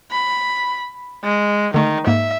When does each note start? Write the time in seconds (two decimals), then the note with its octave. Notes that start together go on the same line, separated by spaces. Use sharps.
0.11 B5
1.23 G#3
1.74 D3 D#3 A3
2.07 G#2 A#3 E5